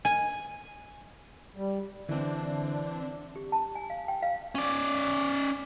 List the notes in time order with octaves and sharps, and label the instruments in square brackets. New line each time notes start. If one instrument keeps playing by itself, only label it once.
[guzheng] G#5
[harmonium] G3
[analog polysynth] D3 D4 [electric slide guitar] E3 C4
[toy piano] G4
A5
G#5
F5
G5
F5
[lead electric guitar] C#4 D5